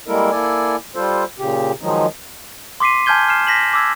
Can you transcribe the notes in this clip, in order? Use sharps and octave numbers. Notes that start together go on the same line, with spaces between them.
G3 G#3 A#3 E4 A4 A#4
A#3 E4 A4 D5 G#5
G3 F4 A4 C5
A#2 C#3 G4
D#3 F3 F#3 G#3 D#4
C6 D6 B6 C7 D#7
G#5 A5 F6 G6 G#6 G7
F6 C7 E7
A#6 B6 E7 F#7
D6 E6 G#6